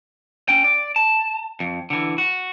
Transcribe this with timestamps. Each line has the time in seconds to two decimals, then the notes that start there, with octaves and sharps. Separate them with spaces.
0.49 C#4 G5
0.64 D5
0.96 A5
1.60 F2
1.90 D3 E3
2.18 F#4